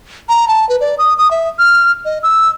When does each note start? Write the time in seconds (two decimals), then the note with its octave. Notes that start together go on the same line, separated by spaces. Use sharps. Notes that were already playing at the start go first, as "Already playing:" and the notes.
0.29 A#5
0.48 A5
0.69 B4
0.81 D5
0.98 D#6
1.18 D#6
1.31 E5
1.59 F6
2.05 D#5
2.23 E6